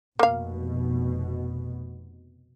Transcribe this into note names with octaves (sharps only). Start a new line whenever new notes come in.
F1 B2 A#3 F5